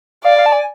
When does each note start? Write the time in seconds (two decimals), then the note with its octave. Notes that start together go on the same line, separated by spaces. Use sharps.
0.24 D5 F5
0.38 F5
0.46 A5
0.53 G#5